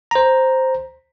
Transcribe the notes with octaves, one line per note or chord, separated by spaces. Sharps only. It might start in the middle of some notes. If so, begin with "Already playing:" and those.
C5 A#5